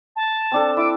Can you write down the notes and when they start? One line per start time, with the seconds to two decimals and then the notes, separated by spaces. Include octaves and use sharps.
0.16 A5
0.52 C4 D4 A4
0.77 E4 D6 E6